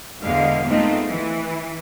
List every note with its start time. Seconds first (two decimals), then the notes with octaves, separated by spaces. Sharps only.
0.21 E2 B2 D3 G#3 F5
0.67 G#3 A3 B3 C4 D#4 F4
1.08 E3